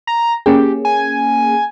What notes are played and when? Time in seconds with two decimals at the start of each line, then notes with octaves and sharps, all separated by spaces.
0.07 A#5
0.46 A#3 C#4 G4 G#4
0.85 G#5